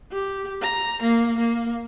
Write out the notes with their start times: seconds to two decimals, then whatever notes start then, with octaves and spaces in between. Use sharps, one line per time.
0.12 G4
0.62 A#5
1.02 A#3
1.38 A#3